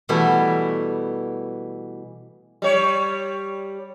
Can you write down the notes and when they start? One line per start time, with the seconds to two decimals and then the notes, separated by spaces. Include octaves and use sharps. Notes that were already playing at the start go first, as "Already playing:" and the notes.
0.09 B2 E3 G3 A3 E4
2.62 G3 C#5